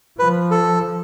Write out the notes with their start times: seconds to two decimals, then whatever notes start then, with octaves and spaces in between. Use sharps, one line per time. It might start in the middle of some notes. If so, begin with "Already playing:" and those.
0.19 F3 B4
0.51 A4